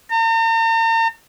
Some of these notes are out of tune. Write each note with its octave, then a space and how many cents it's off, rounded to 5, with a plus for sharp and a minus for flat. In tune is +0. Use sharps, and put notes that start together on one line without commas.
A#5 -45